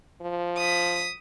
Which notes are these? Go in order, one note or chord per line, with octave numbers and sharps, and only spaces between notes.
F3
D#6 B6